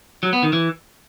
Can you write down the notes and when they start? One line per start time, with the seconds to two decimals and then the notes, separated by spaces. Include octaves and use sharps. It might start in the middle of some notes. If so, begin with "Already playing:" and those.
0.23 F#3
0.33 B3
0.43 D#3
0.53 E3